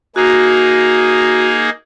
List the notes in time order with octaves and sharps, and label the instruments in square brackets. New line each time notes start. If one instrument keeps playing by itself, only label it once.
[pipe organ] A#3 D#4 G#4 [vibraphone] F#4